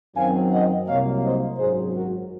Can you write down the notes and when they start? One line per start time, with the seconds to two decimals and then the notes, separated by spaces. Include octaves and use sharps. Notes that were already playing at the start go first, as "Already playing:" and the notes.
0.16 F#2 D#3 F#3 C4 F5 G#5
0.52 D#5 F#5
0.88 C2 C3 F#3 A#3 C#5 F5
1.23 C5 D#5
1.58 G#1 F#2 D#3 F#3 G#4 C5
1.94 F#4 A#4